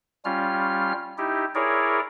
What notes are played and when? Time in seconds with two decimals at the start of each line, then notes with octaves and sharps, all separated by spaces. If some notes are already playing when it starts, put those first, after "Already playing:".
0.25 G3 C#4 F4 F6
1.18 D#4 E4 G4
1.55 E4 G#4 A#4 C#5 D5